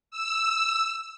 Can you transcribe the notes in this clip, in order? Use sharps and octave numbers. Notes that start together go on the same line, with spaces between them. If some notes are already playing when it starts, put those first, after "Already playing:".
E6